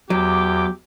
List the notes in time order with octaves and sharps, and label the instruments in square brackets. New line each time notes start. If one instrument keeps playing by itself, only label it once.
[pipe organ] E2 D6 [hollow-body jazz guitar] F#3 [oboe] G4